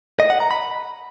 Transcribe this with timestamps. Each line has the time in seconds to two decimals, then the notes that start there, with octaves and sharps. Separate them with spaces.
0.20 D#5
0.30 F#5
0.40 A#5
0.51 B5